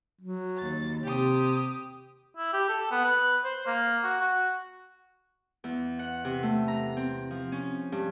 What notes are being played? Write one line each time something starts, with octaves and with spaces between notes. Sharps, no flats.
F#3
D#2 A6
C3 G4 D#6
E4
G4
A4
B3
B4
C5
A#3
F#4
F#4
E2
F#5
C3
A3
A#5
C4
F3
C#4
G2